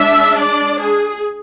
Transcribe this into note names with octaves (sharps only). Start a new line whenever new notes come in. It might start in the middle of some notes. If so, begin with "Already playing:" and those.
Already playing: G#3 D4 E5
D5
G#4